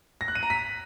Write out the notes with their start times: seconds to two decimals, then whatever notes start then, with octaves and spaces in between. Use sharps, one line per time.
0.21 A#6
0.28 F#6
0.35 D#7
0.43 A#5
0.50 B6